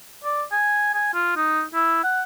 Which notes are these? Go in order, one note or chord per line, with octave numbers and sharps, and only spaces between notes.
D5
G#5
G#5
F4
D#4
E4
F#5